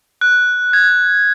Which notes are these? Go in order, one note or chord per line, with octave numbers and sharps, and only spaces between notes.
F#6
G#6